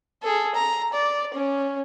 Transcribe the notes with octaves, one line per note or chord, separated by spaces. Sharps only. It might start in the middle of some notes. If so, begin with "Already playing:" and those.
G#4 A4
A#5
D5
C#4